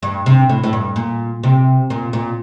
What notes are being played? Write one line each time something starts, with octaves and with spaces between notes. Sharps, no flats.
G2
C3
A2
A2
G2
A#2
C3
A#2
A#2